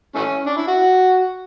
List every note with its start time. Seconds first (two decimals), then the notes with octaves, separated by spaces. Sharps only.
0.15 E3 A3 C#4
0.46 D4
0.57 E4
0.67 F#4